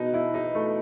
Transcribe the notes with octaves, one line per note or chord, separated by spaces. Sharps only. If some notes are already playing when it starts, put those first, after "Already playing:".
Already playing: B2 D#4
E4
D#4
A3